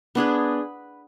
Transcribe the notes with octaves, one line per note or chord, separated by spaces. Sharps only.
B3 D4 G#4 B4